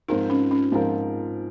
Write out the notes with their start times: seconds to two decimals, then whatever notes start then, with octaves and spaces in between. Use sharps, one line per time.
0.08 G#2 F3 C4 D#4 F4 A#4
0.30 C#4
0.51 C#4
0.72 G#2 F3 C4 F4 A#4